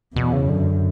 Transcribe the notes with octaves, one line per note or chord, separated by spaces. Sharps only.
E2 B2
C#3
F#2 D3